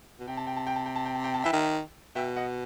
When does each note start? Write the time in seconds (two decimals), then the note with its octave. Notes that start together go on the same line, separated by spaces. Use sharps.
0.20 B2
0.28 C3 G5
0.37 A5
0.47 G5
0.56 A5
0.67 G5
0.76 A5
0.86 G5
0.96 A5
1.05 G5
1.15 A5
1.24 G5
1.34 A5
1.44 E3 E5 G5
1.53 D#3
2.15 B2 E5 G5
2.36 D#5 F#5